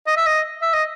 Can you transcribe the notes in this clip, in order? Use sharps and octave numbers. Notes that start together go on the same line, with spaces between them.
D#5
E5
D#5
E5
D#5